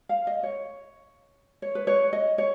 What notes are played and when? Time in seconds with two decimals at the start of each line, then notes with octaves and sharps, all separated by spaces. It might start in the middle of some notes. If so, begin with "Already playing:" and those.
0.09 F5
0.27 D#5
0.43 C#5
1.62 C#5
1.75 B4
1.87 C#5
2.13 D#5
2.38 C#5